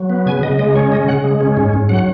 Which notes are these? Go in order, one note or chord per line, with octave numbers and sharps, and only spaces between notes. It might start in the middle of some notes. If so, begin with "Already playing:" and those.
Already playing: F#3
B3
C#3 G#5
C#3 D#5
G#3 D#5
C#4 C#5
C#3 D#5
C#3 F#5
G#3
C#4
G#2
G#2
F#3 F#5